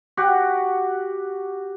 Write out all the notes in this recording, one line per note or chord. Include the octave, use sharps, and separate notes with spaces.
F#4 G4 F#5